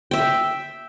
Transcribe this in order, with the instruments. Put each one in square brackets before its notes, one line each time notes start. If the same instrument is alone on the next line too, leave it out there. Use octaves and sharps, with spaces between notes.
[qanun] E5 G5